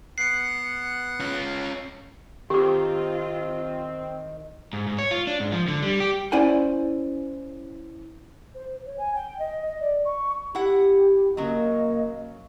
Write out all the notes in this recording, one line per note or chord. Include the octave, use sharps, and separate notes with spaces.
B3 F#5 F#6 C7 C#7
C#4 F4
D#3 C4 F4 G4 D6
G#2
G#2
C#5
F4
D4
G#2
F3
D3
G3
G4
C#4 E4 C5 D5 F#5 G#5
C5
C#5
G#5
G5
D#5
D#5
D5
C#6
E4 G4 F#5
C#3 F#3 A#3 D#5